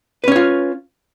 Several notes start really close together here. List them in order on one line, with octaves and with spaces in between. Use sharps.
B4 C#4 C#5 F4